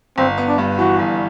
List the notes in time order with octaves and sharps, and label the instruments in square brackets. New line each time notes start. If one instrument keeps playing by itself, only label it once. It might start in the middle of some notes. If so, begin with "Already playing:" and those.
[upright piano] G1 [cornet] C4
[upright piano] B3
[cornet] D4
[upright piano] G2
[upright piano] E3 [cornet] F#4
[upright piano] G1